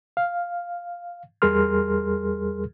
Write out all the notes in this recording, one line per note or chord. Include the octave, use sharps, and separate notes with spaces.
F5
E2 G3 G#4 A#4 C6 F6